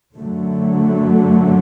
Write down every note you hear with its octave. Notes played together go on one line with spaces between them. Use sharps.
F#2 D3 F#3 A3